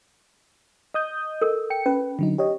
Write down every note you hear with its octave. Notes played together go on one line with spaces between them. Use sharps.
D#5 D#6 G6
A4 A#4
G5 C#7
C#4 B4
D3 F#3 D#4
G4 C#5 D#5